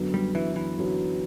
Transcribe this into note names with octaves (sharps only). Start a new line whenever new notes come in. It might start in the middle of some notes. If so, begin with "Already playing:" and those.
Already playing: F#2 D3 F#3 B3
G3
E3
E3
F#2 D3 F#3 B3